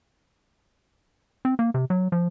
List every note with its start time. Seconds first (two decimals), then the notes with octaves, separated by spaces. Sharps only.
1.45 C4
1.59 A#3
1.74 C3
1.90 F#3
2.12 F3